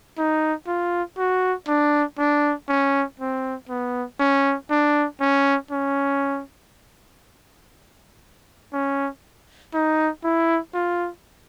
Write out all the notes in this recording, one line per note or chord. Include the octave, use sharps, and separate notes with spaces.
D#4
F4
F#4
D4
D4
C#4
C4
B3
C#4
D4
C#4
C#4
C#4
D#4
E4
F4